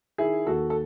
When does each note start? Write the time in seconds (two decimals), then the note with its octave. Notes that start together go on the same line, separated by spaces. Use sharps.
0.18 D#3 E4 G#4
0.47 D#2 F#4 A4
0.70 A4